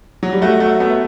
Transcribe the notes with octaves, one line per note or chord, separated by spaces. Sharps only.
F#3
G3
A3 F#4
F#3 A3
A3 B3